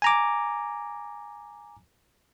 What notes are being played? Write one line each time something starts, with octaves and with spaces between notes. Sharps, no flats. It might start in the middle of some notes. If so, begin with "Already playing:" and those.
G#5 A#5 D6